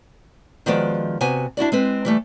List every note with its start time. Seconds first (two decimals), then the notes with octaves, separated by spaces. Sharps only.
0.66 D#3 F3 G#3 B3 F#4 D5
1.21 C3 B3 F#4 G#5
1.57 D4 E4 F#4 D5
1.72 G#3 C4 B4
2.05 E3 G3 A3